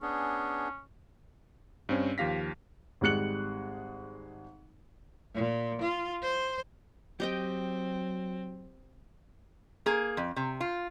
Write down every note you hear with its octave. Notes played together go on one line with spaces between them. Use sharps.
B3 C#4 D4 G#4
G2 C4 C#4
D#2 F3 G4 F5 A#6 B6
G#1 G3 G#3 F#6 C#7 F#7
A#2
F4
C5
F#3 C4 G4 D#5 G5
A#3 G#4
F2
C3
F4